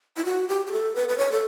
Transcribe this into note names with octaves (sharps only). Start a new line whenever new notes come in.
E4
F#4
G4
G4
A4
B4
B4
C#5
A4